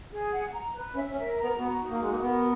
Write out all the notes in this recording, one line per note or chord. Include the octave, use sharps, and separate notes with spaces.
G#4
F#5
A#5
B4
C#4 E5
C#4
A#4
A#5
B3
B3 F#4
D#4
A#3
G#3 F#4
A#3
B3 A#4